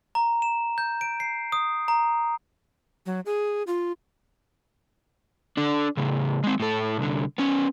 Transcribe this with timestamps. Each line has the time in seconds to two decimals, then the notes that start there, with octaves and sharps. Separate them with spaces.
0.15 A#5
0.42 E7
0.78 G6
1.01 D7
1.20 C7
1.52 D#6
1.88 A#5
3.06 F#3
3.26 G#4
3.67 F4
5.57 D4 A4
5.97 A2 C#3
6.44 G#3 C4
6.60 A2 A4
6.98 C2 D3
7.38 B3 C#4